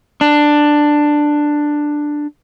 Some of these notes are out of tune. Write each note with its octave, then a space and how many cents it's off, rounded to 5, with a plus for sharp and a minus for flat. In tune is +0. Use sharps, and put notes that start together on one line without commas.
D4 +10